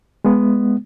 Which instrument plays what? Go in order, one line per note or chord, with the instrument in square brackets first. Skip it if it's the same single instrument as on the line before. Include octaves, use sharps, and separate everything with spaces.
[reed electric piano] G#3 B3